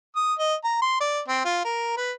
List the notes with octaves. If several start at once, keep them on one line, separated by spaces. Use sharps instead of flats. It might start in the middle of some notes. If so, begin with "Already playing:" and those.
D#6
D#5
A#5
C6
D5
C4
F4
A#4
B4